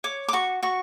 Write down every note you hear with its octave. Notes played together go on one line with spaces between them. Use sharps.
C#5 D6
D6
F#4 C#6
F#4 C#6